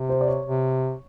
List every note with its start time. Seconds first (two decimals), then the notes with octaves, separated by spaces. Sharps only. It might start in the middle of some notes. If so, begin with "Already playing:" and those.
Already playing: C3
0.09 C5
0.21 D5
0.27 C#5
0.46 C3